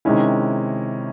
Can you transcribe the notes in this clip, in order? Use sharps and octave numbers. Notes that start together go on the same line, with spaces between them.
C3 D#3 G#3 C#4 E4